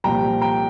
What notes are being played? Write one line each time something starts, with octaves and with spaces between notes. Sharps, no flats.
C2 A#2 F3 G5 A#5
G5 A#5